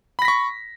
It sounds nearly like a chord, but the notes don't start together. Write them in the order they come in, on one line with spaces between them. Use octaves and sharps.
B5 A#6 B6 C#6